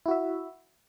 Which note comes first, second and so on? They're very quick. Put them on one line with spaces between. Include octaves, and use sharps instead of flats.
E4 F#4 E5